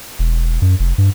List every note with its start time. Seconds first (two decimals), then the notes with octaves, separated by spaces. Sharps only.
0.19 E1
0.62 F#2
0.79 F1
0.98 G2